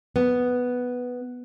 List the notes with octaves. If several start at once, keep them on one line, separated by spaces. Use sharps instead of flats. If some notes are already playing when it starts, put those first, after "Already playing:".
B3